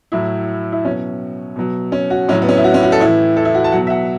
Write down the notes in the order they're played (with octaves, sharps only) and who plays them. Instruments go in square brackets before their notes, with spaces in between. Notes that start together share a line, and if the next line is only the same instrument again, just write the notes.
[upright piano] A2 F#3 E4
E4
B2 F#3 C#4
B2 F#3
C#4
F#4
A2 F#3 C#4
B3
C#4
E4
F#4
C#4
F#4
A4
A2 E3 E4
A4
E4
F#4
A5
B2 F#3 F#5
E5
F#5